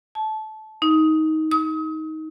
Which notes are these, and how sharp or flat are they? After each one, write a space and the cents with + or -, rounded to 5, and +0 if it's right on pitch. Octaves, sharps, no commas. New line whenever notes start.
A5 -20
D#4 +15
D#6 +35